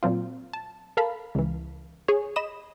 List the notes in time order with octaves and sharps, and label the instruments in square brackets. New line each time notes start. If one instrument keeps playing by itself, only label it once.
[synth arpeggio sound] A#2 F#3 C4 F4
A5
A4 A#4 F5 A5 B5
C#2 E3
G#4 C#5
D#5 B5 D#6 E7